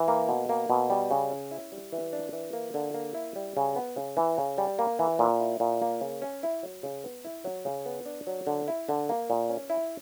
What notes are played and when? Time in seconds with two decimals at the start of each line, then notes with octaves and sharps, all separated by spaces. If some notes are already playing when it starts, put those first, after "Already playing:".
Already playing: E3
0.08 A#3
0.29 B2
0.49 A#3
0.70 B2
0.90 G3
1.11 C#3
1.31 C#4
1.51 E4
1.72 G3
1.92 E3
2.13 D4
2.33 E3
2.53 A#3
2.74 D3
2.94 A#3
3.14 E4
3.36 G3
3.57 C#3
3.76 B3
3.96 C#3
4.17 E3
4.38 C#3
4.58 G3
4.79 A#3
4.99 E3
5.19 A#2
5.40 E4
5.60 A#2
5.82 A#3
6.01 C#3
6.22 C#4
6.43 E4
6.63 F#3
6.83 C#3
7.04 B3
7.25 E4
7.45 F#3
7.65 C#3
7.86 B3
8.06 D4
8.27 F#3
8.47 D3
8.68 E4
8.89 D3
9.09 A#3
9.30 A#2
9.50 C#4
9.70 E4